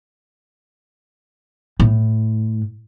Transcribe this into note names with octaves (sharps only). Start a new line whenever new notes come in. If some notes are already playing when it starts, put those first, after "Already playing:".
A2